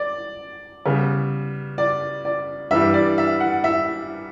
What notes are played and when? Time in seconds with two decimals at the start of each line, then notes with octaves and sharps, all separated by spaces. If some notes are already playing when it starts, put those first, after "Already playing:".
Already playing: D5
0.85 C#3 G3 B3
1.78 D5
2.25 D5
2.71 G2 E3 G3 E5
2.94 D5
3.18 E5
3.40 F#5
3.64 E5